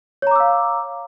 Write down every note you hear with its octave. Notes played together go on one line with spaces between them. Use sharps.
C#5 F5 A#5 D6 E6